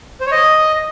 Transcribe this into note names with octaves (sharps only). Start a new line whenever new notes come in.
C5
C#5
D#5